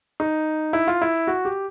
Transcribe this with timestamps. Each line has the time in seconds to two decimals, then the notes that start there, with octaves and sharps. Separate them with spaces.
0.20 D#4
0.73 E4
0.87 F4
1.02 E4
1.27 F#4
1.45 G4